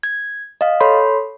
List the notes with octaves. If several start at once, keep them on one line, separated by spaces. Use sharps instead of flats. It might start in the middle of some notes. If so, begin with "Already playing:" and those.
G#6
D#5 F5
A4 C#5 B5 C6